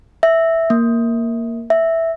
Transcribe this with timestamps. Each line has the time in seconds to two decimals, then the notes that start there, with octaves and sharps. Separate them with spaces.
0.23 E5
0.70 A#3
1.70 E5